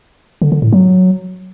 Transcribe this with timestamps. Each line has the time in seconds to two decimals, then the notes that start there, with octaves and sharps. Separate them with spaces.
0.42 D3
0.52 D3
0.62 A2
0.73 F#3